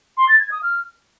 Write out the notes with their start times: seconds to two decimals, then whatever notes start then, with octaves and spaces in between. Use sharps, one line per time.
0.17 C6
0.29 A6
0.40 G#6
0.51 D#6
0.63 F6